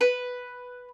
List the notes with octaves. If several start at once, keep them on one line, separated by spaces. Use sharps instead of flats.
B4